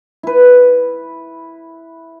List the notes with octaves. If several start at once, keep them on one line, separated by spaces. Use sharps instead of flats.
E4 B4